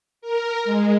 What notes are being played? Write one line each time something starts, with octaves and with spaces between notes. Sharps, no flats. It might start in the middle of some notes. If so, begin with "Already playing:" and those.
A#4
G#3